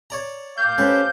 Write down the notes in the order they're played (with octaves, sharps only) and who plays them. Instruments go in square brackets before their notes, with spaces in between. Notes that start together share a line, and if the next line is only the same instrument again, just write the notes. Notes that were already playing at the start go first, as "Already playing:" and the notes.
[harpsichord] C#5 D5 A#5
[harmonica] F5 G5 D6 [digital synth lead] G6
[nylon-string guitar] C#4 G4 C5 [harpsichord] A4 B4